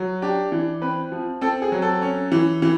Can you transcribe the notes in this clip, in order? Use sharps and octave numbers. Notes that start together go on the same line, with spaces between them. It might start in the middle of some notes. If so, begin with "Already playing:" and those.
Already playing: F#3
D4 G4
E3
C4 B4
F3
C4 A4
G#4
F#3
A4
C#4
E3
E3